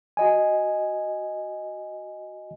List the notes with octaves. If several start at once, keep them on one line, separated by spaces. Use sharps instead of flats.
F#4 D#5 G#5